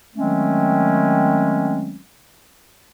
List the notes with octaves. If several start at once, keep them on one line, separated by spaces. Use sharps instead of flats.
D#3 F#3 G#3 A3 C4 C#4